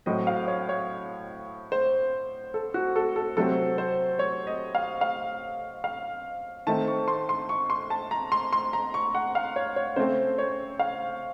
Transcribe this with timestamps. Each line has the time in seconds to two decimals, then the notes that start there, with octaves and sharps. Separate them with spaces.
0.06 A2 F#3 C4 D#5
0.27 F5
0.48 C#5
0.69 C#5
1.72 C5
2.54 A4
2.74 F#4
2.96 A4
3.16 A4
3.37 C3 F#3 A3 C4 A4
3.78 C5
4.19 C#5
4.47 D#5
4.75 F5
5.01 F5
5.84 F5
6.67 D#3 A3 C4 A5
6.88 C#6
7.08 C6
7.29 C6
7.49 C#6
7.70 C6
7.90 A5
8.11 A#5
8.32 C6
8.53 C6
8.73 A#5
8.94 C#6
9.15 F#5
9.35 F5
9.56 C#5
9.76 C#5
9.96 C#3 A3 C4 C5
10.38 C#5
10.79 F5